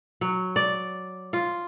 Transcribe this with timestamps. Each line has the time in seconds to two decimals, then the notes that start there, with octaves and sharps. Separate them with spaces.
0.21 F#3
0.56 D5
1.33 F4